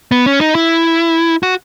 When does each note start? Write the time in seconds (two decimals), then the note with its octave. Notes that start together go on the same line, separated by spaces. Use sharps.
0.12 B3
0.26 C#4
0.41 D#4
0.55 E4
1.43 F#4